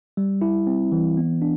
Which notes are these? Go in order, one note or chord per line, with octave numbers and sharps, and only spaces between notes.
G3
E4
C4
E3
B3
D4